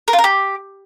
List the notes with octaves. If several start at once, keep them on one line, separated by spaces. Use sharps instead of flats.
A#4
F4
A#4
G4